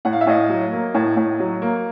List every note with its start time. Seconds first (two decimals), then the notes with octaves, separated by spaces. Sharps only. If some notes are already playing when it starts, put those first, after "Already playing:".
0.05 A2 F#5
0.13 F5
0.21 E5
0.27 A2 D#5 F5
0.49 F#3
0.72 A#3
0.94 A2
1.17 A2
1.40 F#3
1.62 A#3